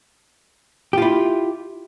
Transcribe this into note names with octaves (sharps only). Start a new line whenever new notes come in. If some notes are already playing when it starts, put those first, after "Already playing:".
E4 F4 G4